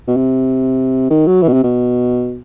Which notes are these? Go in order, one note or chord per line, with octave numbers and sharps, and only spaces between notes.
B2
C3
D#3
F#3
E3
B2
C3
B2